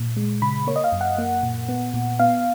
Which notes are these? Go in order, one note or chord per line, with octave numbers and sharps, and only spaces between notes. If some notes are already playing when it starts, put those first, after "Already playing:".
Already playing: A#2
G#3
C#3 B5
A#3 C#5
D#5
F5
F#2
F#5
A#3
A#2
B3
A#2
B3 F5